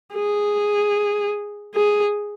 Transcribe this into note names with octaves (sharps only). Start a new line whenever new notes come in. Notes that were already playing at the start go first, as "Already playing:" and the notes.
G#4
G#4